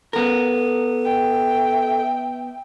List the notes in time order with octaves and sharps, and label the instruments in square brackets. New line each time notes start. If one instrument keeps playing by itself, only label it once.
[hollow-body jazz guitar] B3 A#4 [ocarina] A4
[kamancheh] E5 G5